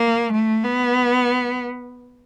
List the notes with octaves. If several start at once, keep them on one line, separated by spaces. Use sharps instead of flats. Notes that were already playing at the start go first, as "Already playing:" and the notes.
Already playing: A#3
A3
B3